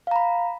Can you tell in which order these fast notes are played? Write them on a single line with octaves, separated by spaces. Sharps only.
F5 A#5 B5